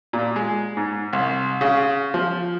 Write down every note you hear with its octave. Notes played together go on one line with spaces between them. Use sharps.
A#2
G#3
G#2
C2
C#3
F3